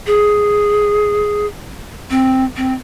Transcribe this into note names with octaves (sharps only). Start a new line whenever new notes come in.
G#4
C4
C4